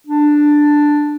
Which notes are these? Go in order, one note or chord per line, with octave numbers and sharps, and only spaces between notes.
D4